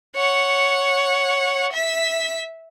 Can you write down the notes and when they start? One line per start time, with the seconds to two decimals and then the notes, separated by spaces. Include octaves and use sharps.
0.16 C#5 F#5
1.73 E5 B6